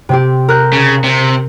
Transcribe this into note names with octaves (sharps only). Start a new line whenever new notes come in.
C3 C4 G4
A#4 F#6 G6
C#3
C3